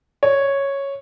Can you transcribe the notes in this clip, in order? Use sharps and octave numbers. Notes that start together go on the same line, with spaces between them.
C#5